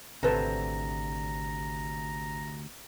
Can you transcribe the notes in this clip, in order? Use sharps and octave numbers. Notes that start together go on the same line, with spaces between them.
G#1 D2 C3 A4 B4 C5 A#5